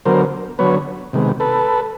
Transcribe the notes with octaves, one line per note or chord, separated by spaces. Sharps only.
D3 F#3 B3 A#4 C5
D3 F#3 B3 B4 C#5
C3 D#3 G#3 B3
A4 B4